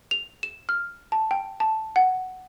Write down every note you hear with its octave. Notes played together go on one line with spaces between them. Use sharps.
F7
E7
F6
A5
G5
A5
F#5